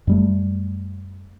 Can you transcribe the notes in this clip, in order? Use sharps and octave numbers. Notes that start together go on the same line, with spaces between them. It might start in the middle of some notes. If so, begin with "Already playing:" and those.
F#2 G3 A3